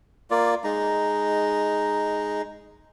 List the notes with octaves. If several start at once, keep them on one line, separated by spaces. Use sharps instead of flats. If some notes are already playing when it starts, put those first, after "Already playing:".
A#3 F4 D5
G#3 D#4 A#5